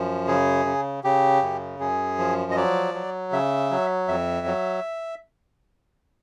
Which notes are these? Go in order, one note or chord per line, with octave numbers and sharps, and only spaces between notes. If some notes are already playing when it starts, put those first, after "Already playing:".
Already playing: F#2 F3
C#3 G#4
C#3
C#3 G4
F#2
F#2 G#4
F3
D#5
F#3 D5
F#3
C#3 E5
F#3
F2 E5
F#3